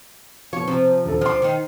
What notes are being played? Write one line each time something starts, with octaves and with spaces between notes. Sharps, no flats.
B2 F3 C#5
C3 F3
D#1 D2 A4
F3 D4 C6 F6
D#3 D#4